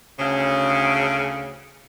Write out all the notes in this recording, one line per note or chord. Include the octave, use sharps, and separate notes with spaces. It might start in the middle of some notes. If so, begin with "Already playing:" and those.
D2 C#3